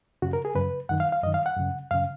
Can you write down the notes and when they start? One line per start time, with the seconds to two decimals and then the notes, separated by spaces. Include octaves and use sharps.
0.22 F#2 C#3 F#4
0.33 A#4
0.45 G#4
0.55 F#2 C#3 B4
0.89 F#2 D#3 F#5
1.00 F5
1.12 F5
1.23 F#2 D#5
1.26 D#3
1.34 F5
1.46 F#5
1.56 F#2 C#3
1.91 F#2 C#3 F5